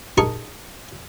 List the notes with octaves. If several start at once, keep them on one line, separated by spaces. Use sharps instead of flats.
D#4 G#4 A#4 A5 C#6